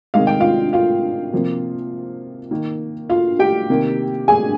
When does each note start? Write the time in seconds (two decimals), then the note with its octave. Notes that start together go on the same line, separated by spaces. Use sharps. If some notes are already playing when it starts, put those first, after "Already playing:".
0.14 C3 D#3 G#3 F5
0.27 G5
0.40 F4 F5
0.73 F4 F5
1.33 C3 F3 A#3
2.51 D#3 A#3
3.10 F4 F5
3.39 G4 G5
3.70 C3 D#3 A#3
4.28 G#4 G#5